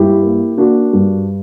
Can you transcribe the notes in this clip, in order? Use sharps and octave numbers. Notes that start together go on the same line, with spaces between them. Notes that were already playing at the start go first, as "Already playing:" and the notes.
Already playing: G2 E4 G4
A#3
A#3 D4 F#4
G2